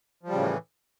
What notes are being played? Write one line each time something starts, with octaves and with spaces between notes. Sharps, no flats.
A2 C#3 E3 F3 G3